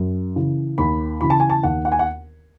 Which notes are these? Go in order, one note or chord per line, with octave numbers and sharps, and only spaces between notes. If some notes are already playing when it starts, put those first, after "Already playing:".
Already playing: F#2
C#3 E3
D#2 B5
C#3 E3 B5
A5
G#5
A5
D#2 F#5
F#5
G#5
F#5